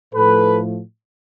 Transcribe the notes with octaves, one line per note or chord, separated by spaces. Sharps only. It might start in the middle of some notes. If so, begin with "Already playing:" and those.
A2 F3 A3 A4 B4